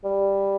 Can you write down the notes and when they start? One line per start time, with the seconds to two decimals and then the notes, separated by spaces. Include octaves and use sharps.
0.04 G3